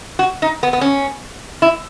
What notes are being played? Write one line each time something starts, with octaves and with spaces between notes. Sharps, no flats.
F#4
D#4
B3
B3
C#4
E4